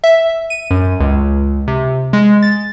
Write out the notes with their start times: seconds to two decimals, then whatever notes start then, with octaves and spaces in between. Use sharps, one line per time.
0.04 E5
0.50 D#7
0.71 F#2
1.00 C#2
1.67 C3
2.13 G#3
2.42 A6